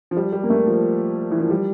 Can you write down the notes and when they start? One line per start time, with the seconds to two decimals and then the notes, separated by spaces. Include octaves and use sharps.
0.11 F3
0.17 G3
0.33 G3
0.43 A#3
0.50 A3
0.67 F3
1.31 E3
1.40 F3
1.50 G3